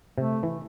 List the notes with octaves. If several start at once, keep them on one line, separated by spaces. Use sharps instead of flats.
C3 A3
E3